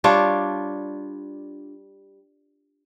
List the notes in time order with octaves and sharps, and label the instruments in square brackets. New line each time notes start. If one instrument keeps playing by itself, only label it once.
[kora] G3 D4 F4 C#5